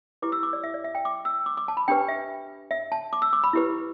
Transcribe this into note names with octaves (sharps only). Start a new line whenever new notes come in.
E4 G4 B4 D6
E6
D6
D5
E5
D5
E5
G5
D6
E6
D6
D6
A5
B5
D4 G4 B4 G5
E5
E5
A5
D6
E6
D6
B5
E4 G4 B4